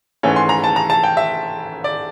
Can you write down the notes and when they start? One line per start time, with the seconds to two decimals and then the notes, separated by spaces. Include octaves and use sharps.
0.23 G#2 E3 A3 C#4
0.36 C6
0.49 A#5
0.64 A5
0.76 A#5
0.90 A5
1.04 G5
1.17 E5
1.84 D5